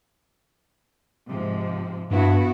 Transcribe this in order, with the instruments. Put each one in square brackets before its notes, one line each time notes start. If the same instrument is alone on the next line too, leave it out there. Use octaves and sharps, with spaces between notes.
[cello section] G#2 C3 F3
[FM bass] G2 [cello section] B3 E4 F#4